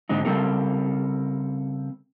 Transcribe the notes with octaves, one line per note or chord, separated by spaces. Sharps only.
G#2 D3 G#3 C4 D#4
C#3 G3 C4 A4 A#4